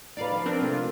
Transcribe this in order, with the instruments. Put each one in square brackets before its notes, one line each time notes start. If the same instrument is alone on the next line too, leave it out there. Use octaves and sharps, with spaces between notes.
[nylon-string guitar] D#4 F4 B4 [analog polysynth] D5 F5
[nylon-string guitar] F3
[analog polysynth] C4 D4 A#4
[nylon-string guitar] C3 A3 [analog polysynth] F4